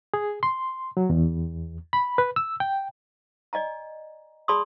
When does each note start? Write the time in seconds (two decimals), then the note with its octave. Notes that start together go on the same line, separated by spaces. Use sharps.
0.14 G#4
0.43 C6
0.97 F#3
1.10 E2
1.93 B5
2.18 B4
2.36 E6
2.60 G5
3.53 D5 D#5 G#5 A#5
4.48 G#4 D5 A5 B5 C6 D#6